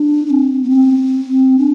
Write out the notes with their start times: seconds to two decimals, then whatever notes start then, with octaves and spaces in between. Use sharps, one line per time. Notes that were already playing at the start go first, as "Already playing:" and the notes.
Already playing: D4
0.26 D4
0.30 C4
0.63 B3
0.70 C4
1.58 D4